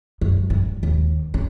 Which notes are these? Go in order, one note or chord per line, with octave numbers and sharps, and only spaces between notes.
F#2
G2
D#2
C#4